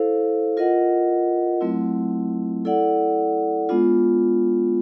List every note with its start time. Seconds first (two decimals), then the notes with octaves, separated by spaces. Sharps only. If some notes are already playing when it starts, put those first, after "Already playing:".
Already playing: E4 A4 C5 F5
0.57 F4 A#4 D#5 F#5
1.61 F#3 A3 C4 E4
2.65 E4 A4 D5 F#5
3.69 G#3 B3 D4 F4